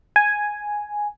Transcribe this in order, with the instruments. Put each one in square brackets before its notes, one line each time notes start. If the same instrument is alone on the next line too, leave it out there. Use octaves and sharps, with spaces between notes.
[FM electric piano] G#5